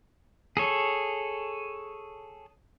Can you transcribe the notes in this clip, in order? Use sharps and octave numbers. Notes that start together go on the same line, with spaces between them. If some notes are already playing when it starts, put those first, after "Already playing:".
G#4 A4 C#5